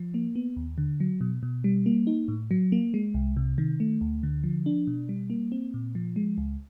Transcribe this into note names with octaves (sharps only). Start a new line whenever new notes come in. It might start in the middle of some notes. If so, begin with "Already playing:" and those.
Already playing: F3
A#3
B3
D#2
D3
F#3
B2
B2
G3
A#3
D#4
A2
F#3
A#3
G#3
C2
C3
D#3
A3
D2
D3
F3
D4
B2
G3
A#3
C4
A#2
F3
G#3
C#2